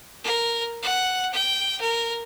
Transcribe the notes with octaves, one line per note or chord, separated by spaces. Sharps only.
A#4
F#5
G5
A#4